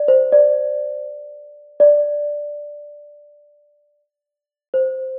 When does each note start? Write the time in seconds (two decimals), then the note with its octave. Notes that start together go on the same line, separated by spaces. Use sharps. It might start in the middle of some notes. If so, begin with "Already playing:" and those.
Already playing: D5
0.08 C5
0.32 D5
1.80 D5
4.74 C5